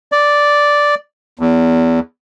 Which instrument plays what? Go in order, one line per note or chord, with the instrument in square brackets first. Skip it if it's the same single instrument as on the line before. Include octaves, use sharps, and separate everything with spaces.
[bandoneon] D5
E2